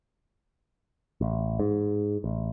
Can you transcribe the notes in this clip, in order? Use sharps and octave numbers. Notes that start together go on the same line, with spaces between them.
A1
G#2
A1